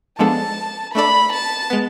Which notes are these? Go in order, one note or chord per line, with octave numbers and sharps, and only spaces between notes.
F3 G#3 B3 D4 A4 A5
A3 D4 A4 D5 B5
A5
G#3 B3